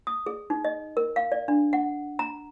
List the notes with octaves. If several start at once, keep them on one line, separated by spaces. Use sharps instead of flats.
D#6
G#4
D#4
D#5
A#4
F5
D5
D4
F#5
A#5